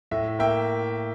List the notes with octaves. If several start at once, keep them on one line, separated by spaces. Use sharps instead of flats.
A2 E5
A#3 E5 G5